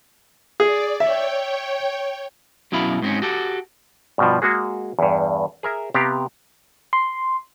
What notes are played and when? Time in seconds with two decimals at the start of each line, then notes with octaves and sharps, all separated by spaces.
0.60 G#4 D5
1.00 C#5 E5 G5
2.72 F#2 B2 E4 F5 B5
3.02 G#2 C4 C#4
3.22 F#4 G4 A4
4.18 G2 B2 F3
4.42 G#3 A#3 F#4 G#4
4.99 E2 G2
5.63 G#4 A#4 E5
5.94 C3 B3 G4 F5 A#5
6.93 C6